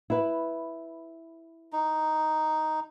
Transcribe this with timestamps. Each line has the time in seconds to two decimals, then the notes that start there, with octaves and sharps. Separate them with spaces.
0.10 E4 B4
1.73 D#4